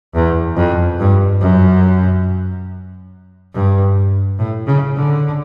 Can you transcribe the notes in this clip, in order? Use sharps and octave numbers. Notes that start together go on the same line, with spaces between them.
E2
F2
G2
F#2
G2
A2
C#3
D3